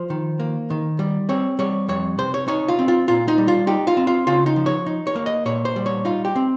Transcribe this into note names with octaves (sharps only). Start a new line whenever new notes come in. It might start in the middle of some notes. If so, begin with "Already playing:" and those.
Already playing: F3 C5
D#3
A#3
D#3
G3
C4 C#5
G3 C#5
F2 C#5
C3 C5
C#5
D#4 C#5
F4
C4
F4
A#2 F4
D#4
G3
F4
D#4 G4
F4
C4
F4
C#3 F4
D#4
F3
C#5
D#4
C#5
A#3
D#5
A#2 C#5
C5
G3
C#5
D#4 F4
G4
C4